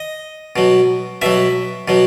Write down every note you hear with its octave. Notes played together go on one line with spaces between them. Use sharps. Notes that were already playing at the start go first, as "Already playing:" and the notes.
Already playing: D#5
B2 F#3
B2 F#3 E5
B2 F#3